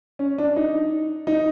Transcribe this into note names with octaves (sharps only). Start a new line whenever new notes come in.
C#4
D4
D#4
D#4